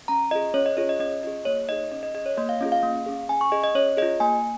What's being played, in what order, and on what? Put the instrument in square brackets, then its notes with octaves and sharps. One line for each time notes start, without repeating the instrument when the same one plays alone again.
[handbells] C#4 A#5
F4 G#4 D#5
C#4 C#5
D#5
F4 G#4 C#5
D#5
C#4 D#5
F4 G#4 D#5
A#3 C#5
D#4 G#4 D#5
C#4 D#5
D#5
G#4 D#5
C#5
A#3 D#5
F5
C#4 F4 G#4 D#5
F5
A#3
C#4 G#4
C#4 G#5
C#6
G#4 D#5
D#5
C#4 C#5
F4 G#4 D#5
A#3 G#5